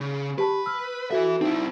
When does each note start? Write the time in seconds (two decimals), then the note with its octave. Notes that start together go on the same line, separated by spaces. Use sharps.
0.01 C#3
0.38 G4 B4 A5
0.66 E6 F6
1.11 F#4 A4 B4 E5
1.41 C4 D#4 E4